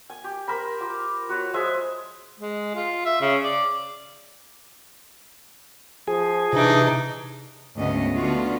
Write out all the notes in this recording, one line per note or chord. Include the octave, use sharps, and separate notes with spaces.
G#5
G4
A#4 C5 B5
F4 D6
F#4 B4 C#5
F3 G#3 G#4 E5
G#3
F4
E5
C#3
D5
F3 G#4
C3 E3 D4 D#4
D2 G#2 C#3 B3 D#5
D3 A3 B3 F4 F#4